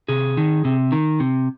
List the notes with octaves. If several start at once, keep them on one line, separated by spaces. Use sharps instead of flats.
C3 G#4
D#3
C3
D#3
C3